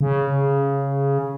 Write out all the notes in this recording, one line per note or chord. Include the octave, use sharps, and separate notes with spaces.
C#3